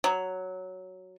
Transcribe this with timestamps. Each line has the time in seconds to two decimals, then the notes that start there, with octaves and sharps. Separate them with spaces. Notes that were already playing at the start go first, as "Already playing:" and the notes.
0.04 F#3